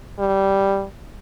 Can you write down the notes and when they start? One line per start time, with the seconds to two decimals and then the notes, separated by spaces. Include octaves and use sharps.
0.19 G3